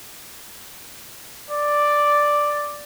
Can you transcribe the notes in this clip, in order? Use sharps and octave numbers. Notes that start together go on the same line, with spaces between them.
D5